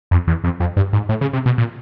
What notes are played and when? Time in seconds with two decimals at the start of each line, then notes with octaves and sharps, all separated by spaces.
0.11 F2
0.27 E2
0.44 F2
0.60 F2
0.77 G2
0.93 G#2
1.09 A2
1.21 C#3
1.33 C3
1.46 B2
1.58 A#2